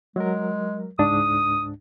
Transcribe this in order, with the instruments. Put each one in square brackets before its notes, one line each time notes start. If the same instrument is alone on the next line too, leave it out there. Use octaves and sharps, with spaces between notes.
[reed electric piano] F#3 A#4 [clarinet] G#3
[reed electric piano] C#2 G#2 D4 [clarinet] D#6